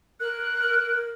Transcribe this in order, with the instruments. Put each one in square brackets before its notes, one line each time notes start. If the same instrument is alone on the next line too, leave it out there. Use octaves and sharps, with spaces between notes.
[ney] A#4 [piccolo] F#6